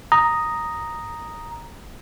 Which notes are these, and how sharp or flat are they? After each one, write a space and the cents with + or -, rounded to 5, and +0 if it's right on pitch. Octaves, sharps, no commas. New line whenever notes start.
A#5 +0 D#6 +0